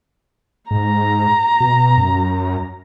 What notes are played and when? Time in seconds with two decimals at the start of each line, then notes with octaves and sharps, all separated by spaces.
0.71 G#2 A#5
1.60 B2
1.97 F#2